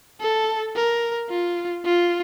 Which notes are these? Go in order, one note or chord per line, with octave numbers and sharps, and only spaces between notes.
A4
A#4
F4
F4